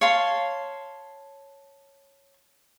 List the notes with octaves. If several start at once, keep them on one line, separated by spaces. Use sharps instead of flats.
C#5 F5 A5 C6